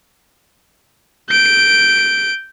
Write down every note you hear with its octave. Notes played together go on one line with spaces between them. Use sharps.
G6 D7